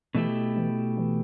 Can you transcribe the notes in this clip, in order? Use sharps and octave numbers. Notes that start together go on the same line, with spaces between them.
B2 E3 A3 E4 G4
E3
E3